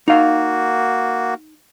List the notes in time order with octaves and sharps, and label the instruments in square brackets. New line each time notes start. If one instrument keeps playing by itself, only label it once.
[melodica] A#3 F#4 [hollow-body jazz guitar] D#4 F5